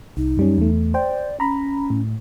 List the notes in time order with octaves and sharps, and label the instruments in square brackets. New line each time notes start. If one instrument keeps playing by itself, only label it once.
[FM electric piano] C2 [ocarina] D#4
[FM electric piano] F#2 G3 C#4
E2 A3
[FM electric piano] C5 G5 [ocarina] D5
[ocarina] C#4 [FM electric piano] A#5 B5
[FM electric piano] A2